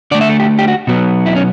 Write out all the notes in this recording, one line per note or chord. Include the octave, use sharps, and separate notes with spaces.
D3 A3 D5
E5
A4
G4
G4
F#4
B2 F#3 B3
E4
C#4